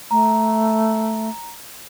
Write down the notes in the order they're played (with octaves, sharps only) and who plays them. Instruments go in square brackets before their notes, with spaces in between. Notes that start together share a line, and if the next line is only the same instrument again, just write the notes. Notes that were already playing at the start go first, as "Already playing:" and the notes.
[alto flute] A3 [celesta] A#5